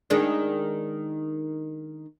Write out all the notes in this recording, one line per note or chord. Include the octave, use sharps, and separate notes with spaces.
D#3 G#3 D4